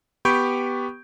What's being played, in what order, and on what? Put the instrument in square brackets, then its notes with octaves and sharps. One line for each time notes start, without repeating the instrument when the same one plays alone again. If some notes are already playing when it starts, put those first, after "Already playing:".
[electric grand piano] B3 G4 B5 C#6 G6 D7